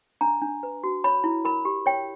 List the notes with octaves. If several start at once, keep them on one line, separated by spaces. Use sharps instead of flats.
D4 A#5
D4
B4
F#4
C#5 B5
E4
A#4 B5
G4
C#5 G5